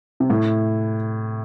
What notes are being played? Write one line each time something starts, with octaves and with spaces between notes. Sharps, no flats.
C3
A2